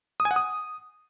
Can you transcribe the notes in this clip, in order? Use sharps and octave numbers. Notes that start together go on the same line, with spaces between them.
D#6
G#5
F#5
D#6